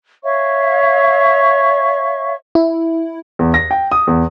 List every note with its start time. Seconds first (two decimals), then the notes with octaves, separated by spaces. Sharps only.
0.23 C#5 E5 F5 C#6
2.55 E4
3.39 E2
3.54 A#6
3.71 G5
3.92 D#6
4.07 E2